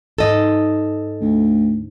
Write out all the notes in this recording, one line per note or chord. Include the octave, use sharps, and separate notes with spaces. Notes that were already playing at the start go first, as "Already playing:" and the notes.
G#2 A4 D#5
D2